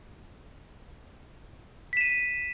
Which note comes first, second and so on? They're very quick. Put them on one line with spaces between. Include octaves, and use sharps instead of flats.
B6 E7 D#7